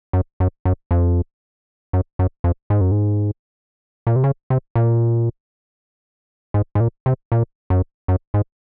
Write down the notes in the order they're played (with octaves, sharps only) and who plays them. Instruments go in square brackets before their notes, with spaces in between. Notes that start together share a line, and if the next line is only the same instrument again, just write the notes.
[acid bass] F#2
F#2
F#2
F2
F#2
F#2
F2
G#2
F#2
G#2
A#2
C3
C#3
C3
A#2
G#2
G#2
A#2
C3
A#2
F#2
F#2
G#2